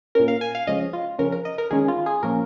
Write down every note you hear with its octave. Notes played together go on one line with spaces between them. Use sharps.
A#2 A#3 C#4 A#4
F5
G#5
F5
C#3 F3 G#3 C#4 D#5
F4
C#3 F3 C#4 A#4
A#4
D#5
A#4
D#3 G#3 C#4 G#4
F4
G#4
A#2 F3 A#3 C#4 A#4